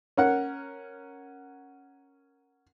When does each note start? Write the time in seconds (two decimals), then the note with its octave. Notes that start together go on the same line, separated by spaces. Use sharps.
0.17 C#4 A#4 F#5